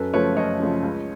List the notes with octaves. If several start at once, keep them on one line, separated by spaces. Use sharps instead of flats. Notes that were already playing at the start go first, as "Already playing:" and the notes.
Already playing: F#2 A4 B4
C#3 F3 A3 B4 C#5
F#2 C#5 D#5
C#3 F3 A3
C#2